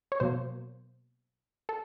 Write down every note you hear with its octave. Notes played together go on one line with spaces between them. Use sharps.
C#5
B2 F#3 A#3 C5
A4